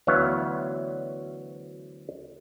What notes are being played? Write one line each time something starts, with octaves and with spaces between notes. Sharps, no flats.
D2 E3 F#3 B3 C#5 F5